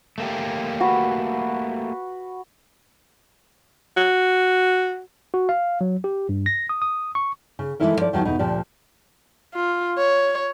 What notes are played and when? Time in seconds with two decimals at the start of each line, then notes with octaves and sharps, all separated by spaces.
0.18 A3 A#3 G4
0.81 F#4 B4
3.97 F#4
5.34 F#4
5.49 F5
5.81 F#3
6.04 G4
6.29 G2
6.46 A#6
6.69 D#6
6.82 D#6
7.15 C#6
7.59 C#3
7.80 E3 G#3 A#3 E4 A4 A#4
7.97 F3 D5
8.13 E2 D#3 F3 F#3
8.25 E2 B2 D#4
8.39 D2 A#2 F3 G4 D5
9.54 F4
9.98 C#5